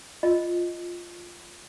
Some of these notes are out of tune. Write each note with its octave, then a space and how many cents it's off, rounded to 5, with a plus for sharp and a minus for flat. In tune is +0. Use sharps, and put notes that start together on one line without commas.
F4 +0 D#5 +0